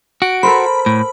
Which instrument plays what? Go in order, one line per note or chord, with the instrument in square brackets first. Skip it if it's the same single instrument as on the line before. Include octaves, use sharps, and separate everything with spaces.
[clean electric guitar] F#4 [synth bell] D7
[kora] A4 A#4 C5 [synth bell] B5
[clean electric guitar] A2